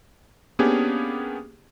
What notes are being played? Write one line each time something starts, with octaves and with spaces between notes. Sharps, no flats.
A#3 B3 C#4 D4 G4 G#4